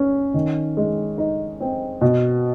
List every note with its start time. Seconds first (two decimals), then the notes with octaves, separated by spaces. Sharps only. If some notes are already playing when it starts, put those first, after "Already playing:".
Already playing: C#4
0.34 D#3
0.77 G#3
1.18 D#4
1.61 C4
2.01 B2